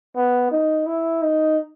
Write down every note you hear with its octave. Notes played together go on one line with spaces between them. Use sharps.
B3
D#4
E4
D#4